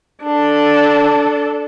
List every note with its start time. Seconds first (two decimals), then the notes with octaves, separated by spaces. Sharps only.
0.23 D4 A4